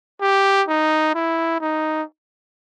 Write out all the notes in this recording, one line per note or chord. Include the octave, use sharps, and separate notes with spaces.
G4
D#4
E4
D#4